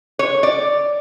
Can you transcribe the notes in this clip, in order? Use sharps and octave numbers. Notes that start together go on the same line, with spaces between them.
C#5
D5